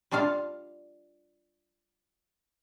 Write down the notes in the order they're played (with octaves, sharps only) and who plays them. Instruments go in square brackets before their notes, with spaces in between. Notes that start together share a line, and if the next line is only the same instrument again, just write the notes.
[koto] G3 D4 F4 F5